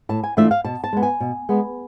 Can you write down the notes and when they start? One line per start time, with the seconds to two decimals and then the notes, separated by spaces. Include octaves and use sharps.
0.09 A2 A5
0.24 G#5
0.37 E3 A3 D4 F4 E5
0.51 F5
0.65 B2 A5
0.84 A5
0.93 G#3 B3
1.03 G#5
1.20 B2
1.49 G#3 B3